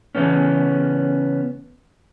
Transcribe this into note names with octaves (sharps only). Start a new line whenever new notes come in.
C#3 E3 A3 B3 C#4